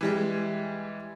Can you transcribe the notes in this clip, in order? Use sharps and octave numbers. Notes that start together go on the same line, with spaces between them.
E3 G3 G#3